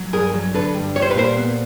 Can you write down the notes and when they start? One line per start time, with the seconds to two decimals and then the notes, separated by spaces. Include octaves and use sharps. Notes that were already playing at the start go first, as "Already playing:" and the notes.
Already playing: F#3
0.13 G2 G#4 A#4
0.34 F#3
0.54 D3 A4 B4
0.74 G2
0.96 G3 C#5
1.02 C5
1.11 B4
1.15 A#2 A#4 C5
1.36 B3